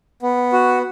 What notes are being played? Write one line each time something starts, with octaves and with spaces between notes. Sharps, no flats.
B3
F#4